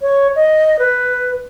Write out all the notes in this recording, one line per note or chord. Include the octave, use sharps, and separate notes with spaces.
C#5
D#5
B4